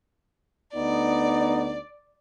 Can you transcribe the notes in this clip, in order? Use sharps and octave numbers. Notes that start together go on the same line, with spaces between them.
D2 B3 D#4 D5